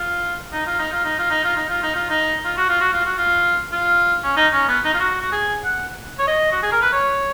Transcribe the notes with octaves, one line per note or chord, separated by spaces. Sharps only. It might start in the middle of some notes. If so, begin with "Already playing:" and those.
Already playing: F4
D#4
F4
D#4
F4
D#4
F4
D#4
F4
D#4
F4
D#4
F4
D#4
F4
F#4
F4
F#4
F4
F#4
F4
F4
C#4
D#4
C#4
B3
D#4
F4
F#4
F#4
G#4
F#5
C#5
D#5
F#4
G#4
A#4
B4
C#5